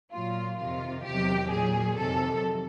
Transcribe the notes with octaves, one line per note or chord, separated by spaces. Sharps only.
A#2 F#3 F4
F2 C3 D#3 F4
E2 C3 D#3 F#3 G4
A#2 F#3 G#4
F2 C3 D#3 F#3 A4